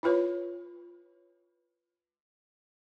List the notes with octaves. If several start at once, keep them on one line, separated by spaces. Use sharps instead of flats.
E4 F4 B4 C#5